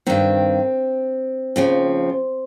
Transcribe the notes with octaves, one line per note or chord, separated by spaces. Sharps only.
G2 D#3 C4
D#2 C#3 F3